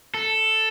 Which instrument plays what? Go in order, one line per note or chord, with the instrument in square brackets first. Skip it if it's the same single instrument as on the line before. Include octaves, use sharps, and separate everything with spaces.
[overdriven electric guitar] A4